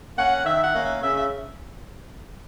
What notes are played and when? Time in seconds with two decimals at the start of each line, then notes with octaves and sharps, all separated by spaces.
0.17 A#3 C#4 F#5
0.45 D#3 E5
0.64 F#5
0.73 A#3 C#4
0.83 E5
1.01 C#3 E5
1.16 E5